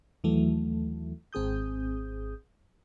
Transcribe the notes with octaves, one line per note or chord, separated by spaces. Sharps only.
D#2 E3 F#3 A3
G#1 C4 G#4 D#6 G6